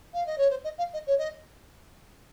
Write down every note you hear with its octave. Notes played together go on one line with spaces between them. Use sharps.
F5
D#5
C#5
C5
D#5
F5
D#5
C#5
D#5